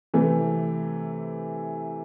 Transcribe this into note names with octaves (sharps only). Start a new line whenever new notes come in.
C3 E3 A3